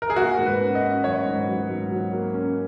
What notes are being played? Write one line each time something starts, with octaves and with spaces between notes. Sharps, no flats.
A#4
G#4
A#3 F#4
G#2
B4
C#4
D#5
C#4
F#3 C#5
G#2
F#3
G#2
F#3
A#3
C#4